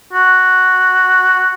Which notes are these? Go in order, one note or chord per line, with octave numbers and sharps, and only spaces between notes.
F#4